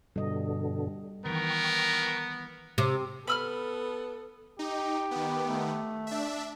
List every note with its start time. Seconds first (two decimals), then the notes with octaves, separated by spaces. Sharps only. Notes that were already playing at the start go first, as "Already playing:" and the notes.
0.16 G2 B2 D3 G3 D#5
1.26 D#3 E3 B3 A#4 G5 C#6
2.78 C3
3.27 B3 A4 B5 E6 F6
4.59 D#4 G4
5.11 D#3 B3
5.46 A3
6.07 D4 E5